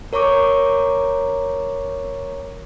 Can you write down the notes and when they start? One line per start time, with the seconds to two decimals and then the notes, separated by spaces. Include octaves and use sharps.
0.13 A#4 C#5 A#5 C#6 D6